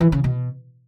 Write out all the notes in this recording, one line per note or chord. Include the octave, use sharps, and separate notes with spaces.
E3
C#3
B2